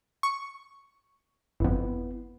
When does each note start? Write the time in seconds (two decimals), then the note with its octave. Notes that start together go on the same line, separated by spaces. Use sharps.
0.23 C#6
1.60 G1 F2 B3 E4